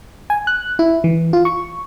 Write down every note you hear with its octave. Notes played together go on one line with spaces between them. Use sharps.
G#5
F#6
E4
E3
F4
C#6